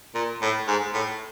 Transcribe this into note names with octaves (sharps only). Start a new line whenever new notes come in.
A#2
A2
G#2
A2